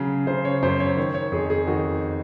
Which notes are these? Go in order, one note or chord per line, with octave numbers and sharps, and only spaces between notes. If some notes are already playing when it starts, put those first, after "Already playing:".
Already playing: C#3 F#3
C#3 C5
C#5
F#2 C5
C#5
D#3 C#5
C#5
F2 G#4
G#4
D#3 F#4